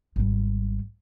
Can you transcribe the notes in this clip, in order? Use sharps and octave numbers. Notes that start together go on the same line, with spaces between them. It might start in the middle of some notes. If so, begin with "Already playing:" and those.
G#1 G3